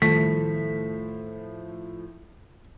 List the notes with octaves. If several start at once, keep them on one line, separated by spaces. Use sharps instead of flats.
A2 D#3 F3 G3 A3 E4 B6